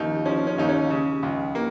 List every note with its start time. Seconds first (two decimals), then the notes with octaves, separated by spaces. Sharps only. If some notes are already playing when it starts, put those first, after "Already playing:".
Already playing: D#2 C#3 D#4
0.25 F3 C#4
0.47 C#4
0.58 D#2 D#4
0.69 C#4
0.90 C#3
1.23 C#2
1.55 A#3